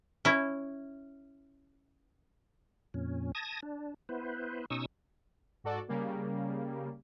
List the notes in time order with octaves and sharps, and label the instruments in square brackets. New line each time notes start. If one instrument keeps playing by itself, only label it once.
[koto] C#4 E4
[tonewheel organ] F2 A#2 C#4
A5 D#6 G#6 A#6
D4
B3 E4 B4 C5
B2 C#4 D#4 C#6 D#6 E6
[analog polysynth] G#2 F#4 A4 D5
C#3 G3 A#3